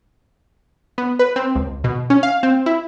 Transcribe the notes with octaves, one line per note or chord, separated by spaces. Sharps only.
B3
B4
C4
C#2
B2
C#4
F5
C4
E4